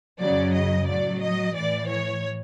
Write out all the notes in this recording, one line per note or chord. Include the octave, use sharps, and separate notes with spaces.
F#2 C#3 F#3 D5
D#5
A2 F#3 D5
D#5
A2 E3 D5
C#5